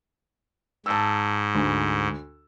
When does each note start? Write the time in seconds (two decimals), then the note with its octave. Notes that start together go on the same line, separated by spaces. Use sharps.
0.86 G#2 A5 E6
1.55 D2